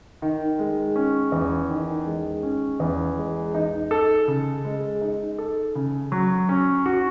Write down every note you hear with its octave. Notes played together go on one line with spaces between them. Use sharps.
D#3
G#3
C#4
E2
D#3
G#3
C#4
E2
G#3
D#4
A4
C#3
G#3
D#4
A4
C#3
F#3
C#4
F#4